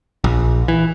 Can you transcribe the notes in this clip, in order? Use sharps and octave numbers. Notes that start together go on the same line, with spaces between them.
A#1
E3